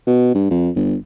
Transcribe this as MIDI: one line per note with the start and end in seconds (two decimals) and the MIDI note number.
0.07 0.33 47
0.35 0.48 43
0.51 0.70 41
0.75 0.96 31